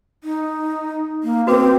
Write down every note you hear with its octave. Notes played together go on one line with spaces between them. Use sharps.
D#4
A#3
C4 F#4 B4 D6